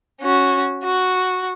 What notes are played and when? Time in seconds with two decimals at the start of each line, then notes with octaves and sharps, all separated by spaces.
0.21 C#4 F#4
0.84 F#4